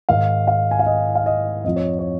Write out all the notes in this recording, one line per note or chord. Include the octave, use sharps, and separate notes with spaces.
G#2 D#3 F5
F5
G#5
F5
D#5
F5
D#5
F2 F3 D#5
C#5
C#5